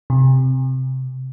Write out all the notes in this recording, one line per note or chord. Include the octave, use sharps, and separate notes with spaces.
C3